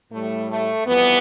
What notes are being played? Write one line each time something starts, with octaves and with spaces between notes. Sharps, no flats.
A2 G3 A3
A3
F2 E3 G3 B3